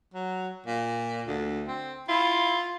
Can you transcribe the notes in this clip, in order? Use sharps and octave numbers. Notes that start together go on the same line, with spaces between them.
F#3
A#2
D2
C4
E4 F4